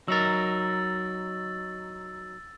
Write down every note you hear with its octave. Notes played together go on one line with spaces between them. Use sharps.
F#3 D#4 A#4 E6 A6